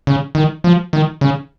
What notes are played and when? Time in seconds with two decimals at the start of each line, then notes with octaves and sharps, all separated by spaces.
0.07 C#3
0.35 D#3
0.64 F3
0.93 D#3
1.21 C#3